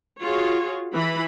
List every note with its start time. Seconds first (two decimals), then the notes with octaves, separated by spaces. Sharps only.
0.23 F4 F#4 G#4 C#5
0.93 E3 B5